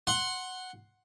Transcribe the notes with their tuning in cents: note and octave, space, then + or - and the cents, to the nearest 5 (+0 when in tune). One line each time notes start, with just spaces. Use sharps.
F#5 +0 C6 +10